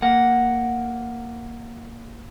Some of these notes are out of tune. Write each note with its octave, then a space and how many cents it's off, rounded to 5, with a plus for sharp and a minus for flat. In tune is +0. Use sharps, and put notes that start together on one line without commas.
A#3 -5 F#5 +0